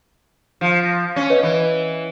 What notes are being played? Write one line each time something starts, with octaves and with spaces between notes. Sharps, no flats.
F3
A#6
C#4
B4 C#5 D#5
E3